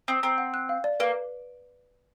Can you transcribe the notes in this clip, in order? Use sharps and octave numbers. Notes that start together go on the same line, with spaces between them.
C4 D#6
C4 A#5
F#5
F#6
F5
D5
A#3 B4